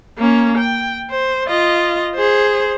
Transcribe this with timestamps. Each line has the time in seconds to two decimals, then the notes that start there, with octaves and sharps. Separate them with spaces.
0.18 A#3 C#4
0.58 G5
1.11 C5
1.48 F4 D#5
2.15 G#4 C5